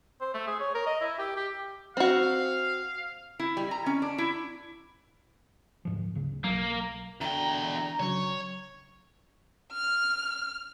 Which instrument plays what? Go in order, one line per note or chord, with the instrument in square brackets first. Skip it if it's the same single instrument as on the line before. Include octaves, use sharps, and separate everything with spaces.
[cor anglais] C5
A3
G#4
C#5
A#4
D#5
E4
G4
G4
[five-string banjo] C4 F#4 [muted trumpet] F5
[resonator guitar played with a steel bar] E4
G3
A#5
C#4
D4
E4
[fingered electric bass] D2 G#2 F3
D1 C#3
[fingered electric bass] B1 F#3 [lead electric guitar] A#3
[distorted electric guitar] E2 G5 [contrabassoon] D3 [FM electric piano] D4 [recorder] A#5
[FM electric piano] C#3 F#3 [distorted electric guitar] C#5
[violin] F6